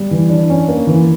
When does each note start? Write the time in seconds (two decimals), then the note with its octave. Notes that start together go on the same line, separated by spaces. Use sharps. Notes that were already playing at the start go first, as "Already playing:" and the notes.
Already playing: G3
0.11 E3
0.29 D4
0.50 C#4
0.68 A#3
0.87 E3